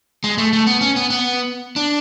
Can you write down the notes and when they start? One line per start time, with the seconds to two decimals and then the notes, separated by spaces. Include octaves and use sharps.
0.24 G#3
0.38 A3
0.53 A3
0.67 B3
0.81 C#4
0.96 B3
1.10 B3
1.76 D4